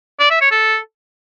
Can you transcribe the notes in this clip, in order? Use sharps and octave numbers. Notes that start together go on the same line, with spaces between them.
D5
E5
C#5
A4